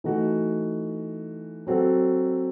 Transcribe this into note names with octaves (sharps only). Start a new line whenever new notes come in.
E3 A3 D#4 F#4
F#3 C4 F#4 A4